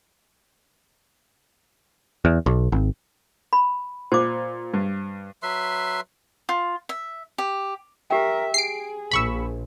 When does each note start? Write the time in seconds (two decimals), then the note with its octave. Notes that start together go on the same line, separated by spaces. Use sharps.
2.25 E2
2.46 B1
2.72 G#1
3.53 B5
4.12 A#2 C5 D6
4.74 G2
5.43 F#3 B4 E5 C6
6.49 F4
6.89 E5
7.38 G4
8.11 G4 A#4 E5 G5
8.54 G#4 C7 D7
9.11 A#1 B5 C#6 E6